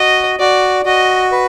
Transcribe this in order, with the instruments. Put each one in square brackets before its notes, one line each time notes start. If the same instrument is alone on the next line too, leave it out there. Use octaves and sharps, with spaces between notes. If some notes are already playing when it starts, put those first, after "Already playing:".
Already playing: [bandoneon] F#4 [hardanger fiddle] D#5
[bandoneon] F#4 [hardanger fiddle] D5
[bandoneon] F#4 [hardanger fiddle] D#5
[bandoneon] B4